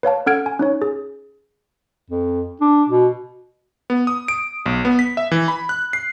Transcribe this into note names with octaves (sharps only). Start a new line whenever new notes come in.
B4 C#5 F5 A5
C#4 A4 F#5 F6 G#6 D7
G#5
C#4 D#4 C#5
G#4
F2
D4
B2
B3
D#6
D7
B1
B3
B6
E5
E3
B5
F#6
C7